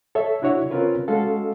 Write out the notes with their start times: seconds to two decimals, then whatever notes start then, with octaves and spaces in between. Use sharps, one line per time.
0.15 A4 C#5 E5
0.42 D4 E4 F#4 C#5
0.70 C4 C#4 F4 A#4 B4 C#5
1.08 G#3 C#4 F#4 A4 F5